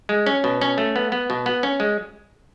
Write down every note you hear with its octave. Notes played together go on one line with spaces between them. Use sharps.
G#3
C#4
B2
C#4
A3
B3
B3
B2
B3
C#4
G#3